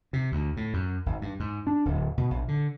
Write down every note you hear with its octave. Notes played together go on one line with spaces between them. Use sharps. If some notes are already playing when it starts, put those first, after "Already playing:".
C3
D2
A2
F#2
G#1
G2
G#2
D4
D1
B2
A#1
D3